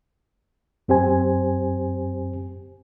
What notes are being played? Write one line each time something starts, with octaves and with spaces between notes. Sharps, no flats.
F#2 C4 G4 C5 G#5